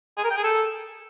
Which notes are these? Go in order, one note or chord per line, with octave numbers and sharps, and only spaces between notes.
G#4
A#4
G5
G#4
A4